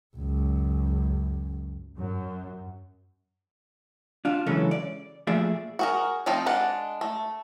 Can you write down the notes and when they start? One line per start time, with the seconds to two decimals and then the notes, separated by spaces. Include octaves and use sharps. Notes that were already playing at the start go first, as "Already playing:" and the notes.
0.17 C#2 F#2
1.97 F#2
4.25 D4 F4
4.46 C#3 E3 F#3 G#3 C#4 A4
4.71 D5
5.27 A#2 F3 A3 G#4 D5 E5
5.79 F#4 G#4 A#4
6.26 F3 A3 C4 D#4 F4
6.46 G#3 D4 F#5
7.01 A3